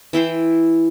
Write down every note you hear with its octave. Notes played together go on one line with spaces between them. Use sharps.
E3 E4 G5 C6